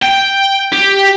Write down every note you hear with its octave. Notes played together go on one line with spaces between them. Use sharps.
G5
G4